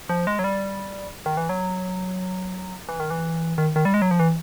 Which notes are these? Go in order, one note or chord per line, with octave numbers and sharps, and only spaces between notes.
F3
G#3
F#3
G3
D#3
E3
F#3
E3
D#3
E3
D#3
D#3
G3
G#3
F#3
F3
E3